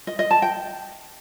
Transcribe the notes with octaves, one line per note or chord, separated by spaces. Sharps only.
D#5
D#5
A5
G5